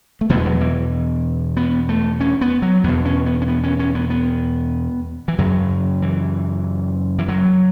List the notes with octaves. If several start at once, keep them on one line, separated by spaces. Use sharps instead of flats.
A3
E2 B2 B3
F#3
E3
B3
A3
C#4
B3
F#3
E2 B2 B3
C#4
B3
C#4
B3
C#4
C#4
B3
B3
E3
F#2 C#3 F#3
E3
E3
F#3